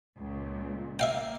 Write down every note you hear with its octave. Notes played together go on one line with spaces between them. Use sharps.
C#2 A#2
A#3 E5 F5 G5